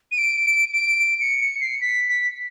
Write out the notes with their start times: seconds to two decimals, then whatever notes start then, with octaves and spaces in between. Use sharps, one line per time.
0.12 D#7
0.18 D7
0.45 D7
0.73 D7
1.00 D7
1.21 C#7
1.41 C#7
1.61 C7
1.81 B6
2.09 B6